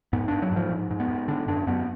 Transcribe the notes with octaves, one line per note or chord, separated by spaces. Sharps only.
G#2 B3
G#2 D4
F#3
G#2 F3
G#2
G#2
B3
G#2
D3 D4
F#2 D4
F#2 B3